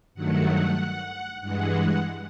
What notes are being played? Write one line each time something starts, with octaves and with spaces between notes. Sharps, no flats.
G2 D#3 F#3 A3 F#5
G2 E3 G#3 F#5